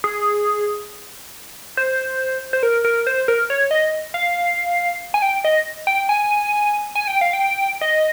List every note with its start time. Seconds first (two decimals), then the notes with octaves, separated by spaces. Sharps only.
0.04 G#4
1.77 C5
2.53 C5
2.63 A#4
2.85 A#4
3.07 C5
3.28 A#4
3.50 C#5
3.71 D#5
4.14 F5
5.14 G#5
5.22 G5
5.44 D#5
5.87 G5
6.09 G#5
6.95 G#5
7.07 G5
7.21 F5
7.33 G5
7.81 D#5